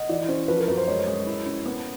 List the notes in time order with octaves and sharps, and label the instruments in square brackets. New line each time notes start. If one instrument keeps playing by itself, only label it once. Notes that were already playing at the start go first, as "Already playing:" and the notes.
Already playing: [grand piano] D#5 F#5
[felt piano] E3 [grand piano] D5
[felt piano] C#4 [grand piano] C5
[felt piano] F3 [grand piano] B4
[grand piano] A#4
[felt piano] F#2 [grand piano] B4
[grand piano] C5
[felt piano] G#3 [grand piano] C#5
[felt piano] G#3
E4
C#4
B3